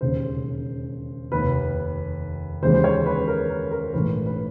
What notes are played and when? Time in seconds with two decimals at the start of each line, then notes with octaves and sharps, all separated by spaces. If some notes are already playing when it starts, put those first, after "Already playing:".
0.01 E1 D#2 C#3 C5
1.32 F1 D#2 D#3 B4
2.63 D#2 C#3 E3 G#3 C5
2.74 C5
2.84 C#5
3.06 B4
3.28 A#4
3.50 A#4
3.71 A#4
3.93 A#1 G#2 E3 A3 B4
4.26 B4